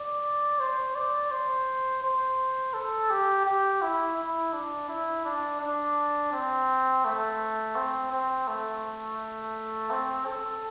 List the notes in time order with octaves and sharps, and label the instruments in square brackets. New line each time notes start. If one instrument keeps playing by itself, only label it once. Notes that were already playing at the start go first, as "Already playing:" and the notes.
Already playing: [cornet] D5
C5
D5
C5
C5
A4
G4
G4
E4
E4
D4
E4
D4
D4
C4
A3
C4
C4
A3
C4
A4